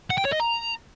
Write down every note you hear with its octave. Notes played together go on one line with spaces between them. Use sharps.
F#5
G5
C#5
D#5
A#5